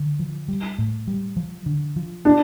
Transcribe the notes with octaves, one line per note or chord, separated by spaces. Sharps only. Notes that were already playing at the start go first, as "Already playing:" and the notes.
Already playing: D3
F3
G3
A2
G3
F3
D3
F3
D4